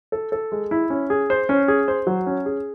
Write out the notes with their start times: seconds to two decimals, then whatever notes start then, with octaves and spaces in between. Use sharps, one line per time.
0.12 A4
0.32 A4
0.52 G#3
0.71 E4
0.90 C#4
1.10 G#4
1.30 C5
1.49 C#4
1.68 G#4
1.88 C5
2.07 F#3
2.27 C#4
2.46 G#4